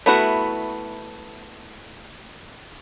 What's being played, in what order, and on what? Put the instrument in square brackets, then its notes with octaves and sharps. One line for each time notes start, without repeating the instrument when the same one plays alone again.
[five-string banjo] A3 B3 E4 F#4